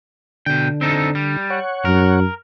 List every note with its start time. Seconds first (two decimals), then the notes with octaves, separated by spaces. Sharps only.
0.46 B2 D3 G5
0.81 C4 D#4 A4
1.15 G3
1.50 C#5 F#5
1.85 F#2 A#4